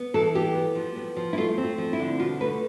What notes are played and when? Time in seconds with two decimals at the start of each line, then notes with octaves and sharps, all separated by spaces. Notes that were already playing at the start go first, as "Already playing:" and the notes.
Already playing: B3
0.14 E3 A4
0.35 B3 G4
0.55 B3
0.75 F3
0.96 B3
1.16 F3
1.33 E4
1.38 A3 F4
1.57 C4
1.64 F4
1.78 F3
1.93 E4
1.99 D3
2.19 B2 F4
2.40 A3 B4